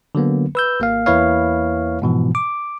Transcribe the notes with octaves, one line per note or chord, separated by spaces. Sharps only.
D3 F#3 A#3 B3
B4 E6 G6
G#1 A#3 F5
E2 A#3 E4 B4 C#5 F5
G#2 B2 E3 F3
D6